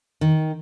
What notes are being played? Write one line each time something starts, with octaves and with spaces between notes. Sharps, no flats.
D#3